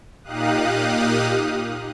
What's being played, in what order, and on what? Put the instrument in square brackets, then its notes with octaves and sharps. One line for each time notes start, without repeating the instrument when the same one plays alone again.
[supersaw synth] A#2 D#4 G4 F5 D#6 F#6